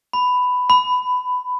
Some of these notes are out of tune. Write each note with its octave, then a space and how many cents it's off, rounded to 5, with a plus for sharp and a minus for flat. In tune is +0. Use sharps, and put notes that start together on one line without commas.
B5 +10
B5 +20